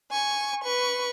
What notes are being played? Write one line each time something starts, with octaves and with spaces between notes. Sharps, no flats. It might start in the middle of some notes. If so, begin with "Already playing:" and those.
G#5 C#6
B4 C#6